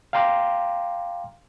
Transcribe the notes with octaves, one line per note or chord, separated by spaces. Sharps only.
F5 G5 A#5 C6 D6